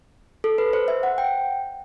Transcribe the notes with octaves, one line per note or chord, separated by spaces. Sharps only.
A4
B4
C5
E5
F#5
G5